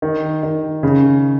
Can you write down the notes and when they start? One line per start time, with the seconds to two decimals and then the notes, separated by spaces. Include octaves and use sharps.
0.02 D#3
0.43 D#3
0.83 C#3